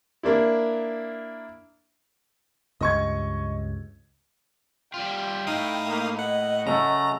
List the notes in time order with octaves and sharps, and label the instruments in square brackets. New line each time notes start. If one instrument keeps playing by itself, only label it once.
[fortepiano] A#3 D4 E4
[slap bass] C#2 G2 [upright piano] D#5 C#6 G#6
[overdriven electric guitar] G3 F4 [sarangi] G5
[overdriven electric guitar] A2 [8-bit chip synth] D#4 F5 D#6
[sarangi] A#3
[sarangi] D#5 [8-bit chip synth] F#5
[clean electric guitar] C#3 F#3 A3 [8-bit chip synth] A#5